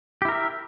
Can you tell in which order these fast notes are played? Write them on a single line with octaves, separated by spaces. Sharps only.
G4 E4 A#4 E5